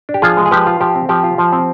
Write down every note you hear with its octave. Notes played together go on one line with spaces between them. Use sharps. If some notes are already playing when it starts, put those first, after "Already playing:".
D4
G4
F3 F4 G#4
G#3
G#4
F3 G4 B4
F4
F3 G4
C4
F3 G4
F4
F3
C4